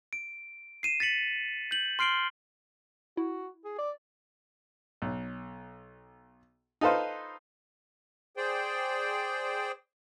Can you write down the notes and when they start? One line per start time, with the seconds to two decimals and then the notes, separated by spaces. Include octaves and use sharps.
0.13 D7
0.83 C7 D#7 E7
1.00 A6 B6 C#7 F#7
1.71 G6 F#7
1.99 C6 F6 C7 D7 F#7 G7
3.17 E4 F#4
3.65 G#4
3.78 D5
5.02 B1
6.81 D#4 F4 A4 B4 C5 F5
8.37 G#4 C5 D5 G5